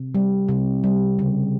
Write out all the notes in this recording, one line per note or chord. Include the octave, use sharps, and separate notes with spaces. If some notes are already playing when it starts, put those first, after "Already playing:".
Already playing: C3
G3
C3
G3
C#3